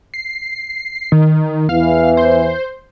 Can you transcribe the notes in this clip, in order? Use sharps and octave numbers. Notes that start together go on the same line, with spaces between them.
C7
D#3
E2 E3 F5
C5